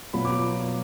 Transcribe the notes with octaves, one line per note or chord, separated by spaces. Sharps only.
B2 F#3 B3 F4 B5
D6